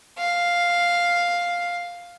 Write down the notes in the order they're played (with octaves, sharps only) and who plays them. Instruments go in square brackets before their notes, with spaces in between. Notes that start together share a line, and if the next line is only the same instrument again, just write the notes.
[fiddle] F5